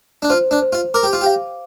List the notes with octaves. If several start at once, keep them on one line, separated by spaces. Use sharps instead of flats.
D4
F4 C5
D4
C5
F4
A#4 D6
G4
F4
G4
F5